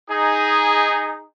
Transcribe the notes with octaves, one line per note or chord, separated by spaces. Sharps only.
D#4 G#4